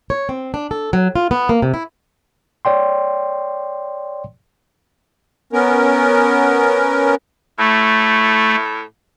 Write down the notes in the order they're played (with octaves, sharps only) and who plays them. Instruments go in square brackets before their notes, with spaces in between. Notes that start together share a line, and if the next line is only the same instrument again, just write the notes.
[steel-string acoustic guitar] C#5
C4
D4
A4
F#3
F4
B3
A#3
C3
E4
[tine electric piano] C#5 D5 G5 C6
[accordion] B3 C#4 A#4
[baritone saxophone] A2 [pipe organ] A3